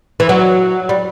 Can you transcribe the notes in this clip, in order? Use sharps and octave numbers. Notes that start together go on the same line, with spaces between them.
E3
F#3
G3